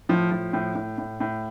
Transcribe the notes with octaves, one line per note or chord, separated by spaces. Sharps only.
A2 F3
F3
A2
A2
A2
A2